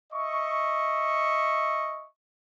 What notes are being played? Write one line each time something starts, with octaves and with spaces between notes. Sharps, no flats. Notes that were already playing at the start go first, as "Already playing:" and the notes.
D#5 E5 C#6